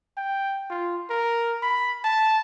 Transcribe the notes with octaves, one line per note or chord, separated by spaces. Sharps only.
G5
F4
A#4
B5
A5